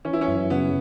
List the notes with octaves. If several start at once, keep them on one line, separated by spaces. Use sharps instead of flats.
E3 C#4
E4
C#4
F#2
C#3 B3